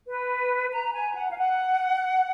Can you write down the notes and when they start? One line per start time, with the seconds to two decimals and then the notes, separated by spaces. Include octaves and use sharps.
0.08 B4
0.72 A#5
0.93 G#5
1.15 F#5
1.31 F5
1.37 F#5